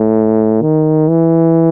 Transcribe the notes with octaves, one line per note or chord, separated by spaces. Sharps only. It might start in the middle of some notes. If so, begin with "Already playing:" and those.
Already playing: A2
D#3
E3